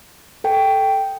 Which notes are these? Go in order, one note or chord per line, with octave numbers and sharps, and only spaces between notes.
A4 G5